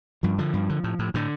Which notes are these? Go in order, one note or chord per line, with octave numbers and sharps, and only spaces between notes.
G2 F3
D3 F3
G2
D3
A2
A2
A2 D3